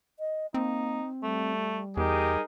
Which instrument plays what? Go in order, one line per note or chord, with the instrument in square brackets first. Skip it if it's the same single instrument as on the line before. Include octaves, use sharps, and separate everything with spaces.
[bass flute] D#5
[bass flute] A#3 [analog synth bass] C4 [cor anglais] D#4
[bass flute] G3 [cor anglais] A3
[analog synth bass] E2 [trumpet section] D#4 G#4 A#4 [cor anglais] G4